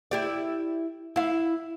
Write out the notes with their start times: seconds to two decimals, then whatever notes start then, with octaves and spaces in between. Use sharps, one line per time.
0.11 E4 G4 D5
1.16 E4 F5